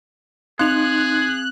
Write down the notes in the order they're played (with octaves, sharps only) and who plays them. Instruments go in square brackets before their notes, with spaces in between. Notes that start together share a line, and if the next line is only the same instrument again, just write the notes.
[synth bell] C4 F7 [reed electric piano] D#4 C6 [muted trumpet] G#4 [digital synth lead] F#6